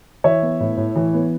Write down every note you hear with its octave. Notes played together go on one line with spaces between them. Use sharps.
E3 C#5 E5
B3
A2
A2
E3
B3